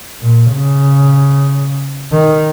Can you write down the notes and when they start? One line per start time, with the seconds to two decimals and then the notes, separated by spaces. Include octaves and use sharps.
0.21 A#2
0.52 C#3
2.12 D#3